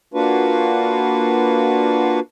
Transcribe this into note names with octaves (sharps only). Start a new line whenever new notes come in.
A#3 D4 F4 F#4 B4